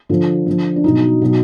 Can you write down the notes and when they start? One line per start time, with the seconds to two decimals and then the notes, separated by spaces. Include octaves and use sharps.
0.09 D3 F3 F4
0.47 D3 F3
0.76 D4
0.84 B2 F#3 D#4
1.21 B2 F#3